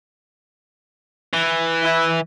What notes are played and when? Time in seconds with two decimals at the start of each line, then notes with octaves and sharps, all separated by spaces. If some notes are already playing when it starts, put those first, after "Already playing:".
1.33 E3
1.83 E4